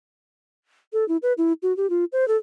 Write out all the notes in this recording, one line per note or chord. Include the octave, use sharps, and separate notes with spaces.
A4
E4
B4
E4
F#4
G4
F4
C5
A4